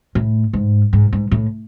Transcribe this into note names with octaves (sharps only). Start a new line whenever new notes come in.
A2
G#2
G#2
G#2
A2